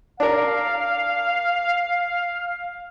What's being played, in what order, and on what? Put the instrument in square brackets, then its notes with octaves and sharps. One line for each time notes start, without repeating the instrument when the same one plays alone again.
[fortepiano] D4 A#4 [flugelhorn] F5